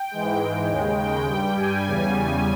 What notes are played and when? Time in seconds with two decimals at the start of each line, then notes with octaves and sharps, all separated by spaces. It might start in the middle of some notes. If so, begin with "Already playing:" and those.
Already playing: G5
0.11 G#2 E3 G#3
0.69 D#2 C#3 G#3
0.98 G5
1.27 G2 G3
1.56 G#5
1.85 E2 C#3 G3
2.13 G#5